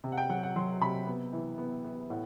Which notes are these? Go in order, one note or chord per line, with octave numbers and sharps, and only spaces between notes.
C3
F#5
G5
F#3 F#5
F#5
F#3 C6
C3 B5
B3
E3
B3
B3
A2 F#5